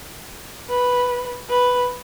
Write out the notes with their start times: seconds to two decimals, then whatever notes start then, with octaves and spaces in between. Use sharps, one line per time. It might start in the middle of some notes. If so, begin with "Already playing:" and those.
0.69 B4
1.50 B4